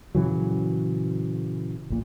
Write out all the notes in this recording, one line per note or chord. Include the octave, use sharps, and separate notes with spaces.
A#2 C#3 E3 F#3
A#1 A#2